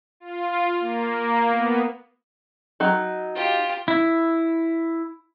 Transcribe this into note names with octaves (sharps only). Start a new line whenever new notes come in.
F4
A#3
B3
F#3 D#4
F4 G4
E4